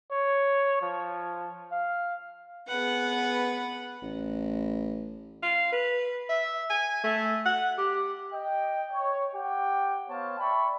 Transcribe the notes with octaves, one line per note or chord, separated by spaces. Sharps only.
C#5
F3
F5
B3 G#4 B4 F#5
A1
F5
B4
E5
G#5
A3
F#5
G4
D#5 G5
C#5
G4 F#5 G5
B3 C5 C#5 F5 A5
D5 E5 G5 A5 B5 C#6